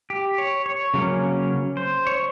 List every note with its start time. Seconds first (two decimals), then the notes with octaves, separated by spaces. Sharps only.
0.10 G4
0.38 C#5
0.66 C#5
0.94 C#3 F#3 A#3 C#4
1.77 C5
2.07 C#5